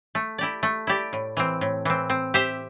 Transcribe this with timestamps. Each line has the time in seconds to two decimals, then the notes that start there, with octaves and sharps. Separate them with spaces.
0.15 A3
0.38 E4 G4 D5
0.63 A3
0.87 E4 G4 D5
1.13 A2
1.37 E3 C4
1.61 A2
1.85 E3 C4
2.10 C4
2.34 G4 C5 E5